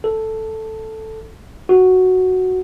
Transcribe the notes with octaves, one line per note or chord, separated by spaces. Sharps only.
A4
F#4